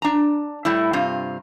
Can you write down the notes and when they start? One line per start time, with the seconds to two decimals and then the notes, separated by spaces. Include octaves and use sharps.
0.02 D4 A#5
0.65 A2 G3 E4
0.93 G2 C3 F4